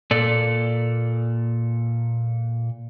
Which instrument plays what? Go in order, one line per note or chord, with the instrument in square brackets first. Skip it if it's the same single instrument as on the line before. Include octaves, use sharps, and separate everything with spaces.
[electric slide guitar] A#2 A4 D5